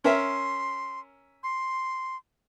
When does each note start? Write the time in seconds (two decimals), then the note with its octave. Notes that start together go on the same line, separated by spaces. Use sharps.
0.04 C#4 A#4 E5 C6
1.43 C6